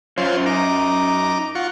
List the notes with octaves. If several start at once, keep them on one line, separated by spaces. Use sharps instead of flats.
F#2 C#4 F4 C5
D#4 A#5 D6
F4 F#5 C#6